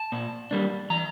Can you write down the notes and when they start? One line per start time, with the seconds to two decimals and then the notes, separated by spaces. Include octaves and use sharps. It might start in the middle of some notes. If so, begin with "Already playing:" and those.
Already playing: A5
0.12 A#2
0.51 G3 A#3 D4
0.90 E3 A#5